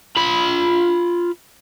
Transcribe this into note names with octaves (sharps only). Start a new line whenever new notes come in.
F4 B5